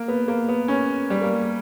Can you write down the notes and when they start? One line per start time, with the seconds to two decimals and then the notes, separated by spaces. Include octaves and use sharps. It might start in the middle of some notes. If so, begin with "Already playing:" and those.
Already playing: A#3
0.08 B3
0.28 A#3
0.48 B3
0.68 C#4
1.10 G3
1.22 A#3